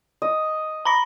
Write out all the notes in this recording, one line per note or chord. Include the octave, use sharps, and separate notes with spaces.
D#5
A#5 B5 A#6